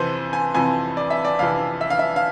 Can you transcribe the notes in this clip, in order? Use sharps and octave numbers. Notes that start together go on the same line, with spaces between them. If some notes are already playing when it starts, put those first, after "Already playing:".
Already playing: F2 C3 E3 B4 C5
G#5
F2 C3 E3 G#5
D5
E5
D5
F2 C3 E3 F5
E5
F5
E5
F5